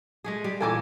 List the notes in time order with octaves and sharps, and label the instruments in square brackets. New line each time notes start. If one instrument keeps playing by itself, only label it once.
[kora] G#3 A3 G#4
G3
[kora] A#2 E3 A#3 [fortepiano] A4 G#5 D6